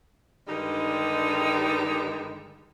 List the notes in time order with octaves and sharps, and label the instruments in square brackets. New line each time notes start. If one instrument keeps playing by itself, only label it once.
[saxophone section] G2 D3 D#3 G3 G#3 D#4